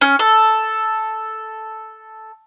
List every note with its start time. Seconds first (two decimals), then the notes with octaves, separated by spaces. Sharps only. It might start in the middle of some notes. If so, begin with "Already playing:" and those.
0.01 C#4
0.19 A4